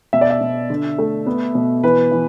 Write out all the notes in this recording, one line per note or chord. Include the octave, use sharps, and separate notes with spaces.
B2 E5
D5
E5
B2
D3
A3
B3
B2
E3 B4
E3